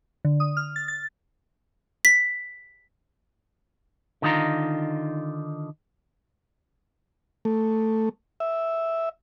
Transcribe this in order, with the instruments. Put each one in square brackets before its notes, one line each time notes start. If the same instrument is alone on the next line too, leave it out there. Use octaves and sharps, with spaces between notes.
[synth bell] D3
D#6
F6
A6
A6
[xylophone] B6
[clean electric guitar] D3 D#3 D#4 F4 A#5
[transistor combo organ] A3
E5